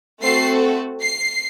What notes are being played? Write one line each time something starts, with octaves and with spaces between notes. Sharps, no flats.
A3 C4 F#4 A4 C7
C7